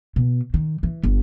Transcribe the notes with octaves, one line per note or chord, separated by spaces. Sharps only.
B2
D#3
E3
G1